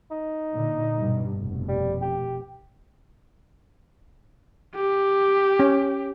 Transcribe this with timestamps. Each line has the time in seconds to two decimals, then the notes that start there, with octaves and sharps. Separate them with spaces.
0.11 D#4
0.55 A#2 D3
0.98 G2 B2
1.31 F1 B2
1.68 G3
2.02 G4
4.75 G4
5.60 C#4